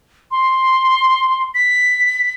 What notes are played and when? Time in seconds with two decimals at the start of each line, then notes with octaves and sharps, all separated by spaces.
0.31 C6
1.55 B6